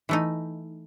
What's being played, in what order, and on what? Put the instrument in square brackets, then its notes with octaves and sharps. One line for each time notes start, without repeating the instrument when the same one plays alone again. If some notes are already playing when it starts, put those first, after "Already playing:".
[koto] E3 A3 D#4